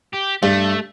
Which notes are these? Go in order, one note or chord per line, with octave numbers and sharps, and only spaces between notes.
G4
G2 A3